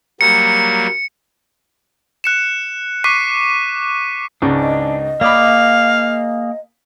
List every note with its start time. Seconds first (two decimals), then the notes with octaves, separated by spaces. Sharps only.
0.21 F#3 G3 A#3 C#7
2.24 F#6 C#7 E7
3.04 C#6 D6 F#6 B6 C7 D#7
4.42 C#2 G#2 C#3 D4
4.60 D#5
5.21 A#3 G#4 D5 F5 B5 D6